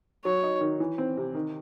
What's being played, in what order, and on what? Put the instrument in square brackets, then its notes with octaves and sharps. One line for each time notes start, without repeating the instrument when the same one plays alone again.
[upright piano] F#3 [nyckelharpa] C#5
[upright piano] D#4
D#3
E3
C4
C3
D#3